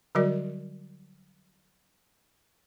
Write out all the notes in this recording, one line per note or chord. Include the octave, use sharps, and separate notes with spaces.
D3 F#3 G3 F#4 A#4 D5